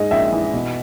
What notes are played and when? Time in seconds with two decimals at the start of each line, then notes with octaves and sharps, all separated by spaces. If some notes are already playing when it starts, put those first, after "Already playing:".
Already playing: G#2 G#3 D#5
0.11 A#1 E5
0.32 E3
0.53 B2